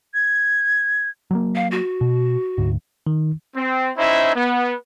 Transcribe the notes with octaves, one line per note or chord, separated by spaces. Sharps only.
G#6
F#3 G3 A#3
F5
F#4
B2
D2 G#2
D#3
C4
C#4 D#4 E4 C5 E5
B3